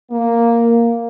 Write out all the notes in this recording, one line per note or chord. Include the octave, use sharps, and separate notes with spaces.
A#3